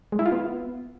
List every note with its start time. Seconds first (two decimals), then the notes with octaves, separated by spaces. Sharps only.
0.12 G#3
0.19 E4
0.26 F4
0.32 B3